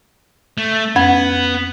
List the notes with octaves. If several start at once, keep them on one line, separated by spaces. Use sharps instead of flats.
A3
F2 B3 C#4 G#6